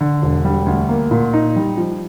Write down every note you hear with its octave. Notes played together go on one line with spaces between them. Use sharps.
D3
E1
G3
D2
A#3
A#2
D#4
G3
F3